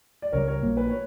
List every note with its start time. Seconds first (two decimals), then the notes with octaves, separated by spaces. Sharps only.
0.22 D5
0.32 C#2 C#3 G3 A#4 C#5
0.47 A#4 C#5
0.62 A#1 A#2 A#3
0.77 B4
0.89 C#5